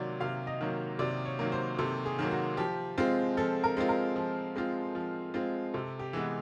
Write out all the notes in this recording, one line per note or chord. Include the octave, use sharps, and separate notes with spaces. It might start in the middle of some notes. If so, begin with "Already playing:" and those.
Already playing: C3 D#3 F#3 A#3 D5
C3 F5
D#5
D#3 F#3 A#3
C3 D5
C#5
D#3 F#3 A#3
C5
C3 A4
G#4
D#3 F#3 A#3
F#4
F3 G4
G#3 C4 F4
F3 A4
A#4
G#3 C4 F4
A#4
F3
G#3 C4 F4
F3
G#3 C4 F4
C3 A4
G4
E3 G#3 B3